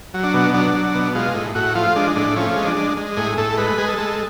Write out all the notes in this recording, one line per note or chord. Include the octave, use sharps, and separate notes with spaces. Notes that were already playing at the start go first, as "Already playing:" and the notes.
F#3
D4
B2
F#3 D4
F#3
B2
G#3 F4
A2
A2 F#4
F3 F4
G#3 D4
A2 D4
F3 C#4
G#3
D4
G#3
G#3
A2 G#4
A2 A4
G#3 B4
G#3 G#4
A4
G#3